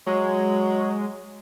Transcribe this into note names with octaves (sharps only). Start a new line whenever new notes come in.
F#3 G#3